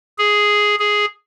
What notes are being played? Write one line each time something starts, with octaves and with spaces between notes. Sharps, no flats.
G#4
G#4